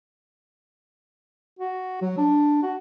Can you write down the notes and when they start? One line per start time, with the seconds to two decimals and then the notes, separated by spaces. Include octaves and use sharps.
1.59 F#4
2.02 F#3
2.18 D4
2.63 F#4